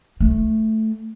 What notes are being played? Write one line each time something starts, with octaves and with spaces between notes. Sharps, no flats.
A3